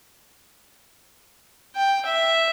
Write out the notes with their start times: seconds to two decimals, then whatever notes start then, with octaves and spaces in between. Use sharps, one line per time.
1.75 G5
2.05 E5